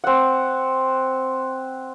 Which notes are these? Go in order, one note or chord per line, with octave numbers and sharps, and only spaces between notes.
C4 F#5